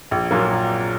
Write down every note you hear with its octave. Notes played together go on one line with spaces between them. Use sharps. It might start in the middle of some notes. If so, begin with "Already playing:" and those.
A#1
A#2 F#3 A#3